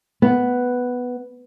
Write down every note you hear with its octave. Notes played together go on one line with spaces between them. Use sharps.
B3